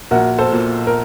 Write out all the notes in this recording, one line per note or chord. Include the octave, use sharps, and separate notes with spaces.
A#1 F#4 A#4
A4 C5
A#2
A#4